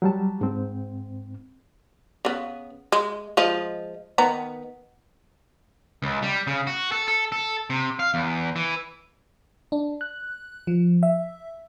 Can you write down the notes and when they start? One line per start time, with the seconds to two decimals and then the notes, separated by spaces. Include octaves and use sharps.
0.02 F#3 G3 A5
0.41 G#2 C4
2.25 C#3 B3
2.92 G#3
3.37 F3 G#3 D#5
4.18 D#3 B3 A#5
6.02 C#2
6.22 G3
6.47 C#3
6.67 F#4
6.92 A4
7.08 A4
7.32 A4
7.70 C3
7.99 F5
8.14 E2
8.56 E3
9.72 D4
10.01 F#6
10.67 F3
11.03 E5